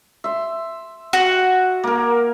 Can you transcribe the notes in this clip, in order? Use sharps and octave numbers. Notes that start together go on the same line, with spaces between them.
E5 C6
F#4
A#3 A#4